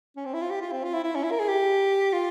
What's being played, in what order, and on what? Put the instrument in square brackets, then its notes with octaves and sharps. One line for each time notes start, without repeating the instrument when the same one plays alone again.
[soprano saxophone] C#4
C4
E4
F4
G4
F4
C4
F4
E4
E4
C#4
E4
A#4
G#4
G4
F4